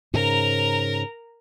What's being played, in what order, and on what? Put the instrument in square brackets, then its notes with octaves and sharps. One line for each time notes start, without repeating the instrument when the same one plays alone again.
[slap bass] G#2 C#3 [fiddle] A#4 A#5